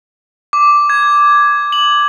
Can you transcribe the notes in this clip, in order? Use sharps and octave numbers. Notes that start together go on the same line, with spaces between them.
D6
G#6
F#7